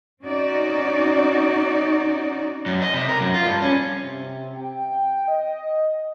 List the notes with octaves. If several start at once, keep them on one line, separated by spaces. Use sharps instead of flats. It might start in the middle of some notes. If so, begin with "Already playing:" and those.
C4 C#4 D#4 F#4 D5
F#2
D#5
C3
A#4
F#2
F4
G2
C#4
C3
G5
D#5